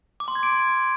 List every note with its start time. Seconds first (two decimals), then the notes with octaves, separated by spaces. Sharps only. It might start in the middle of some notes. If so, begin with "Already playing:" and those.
0.20 D6
0.28 C6
0.35 G#6
0.43 D7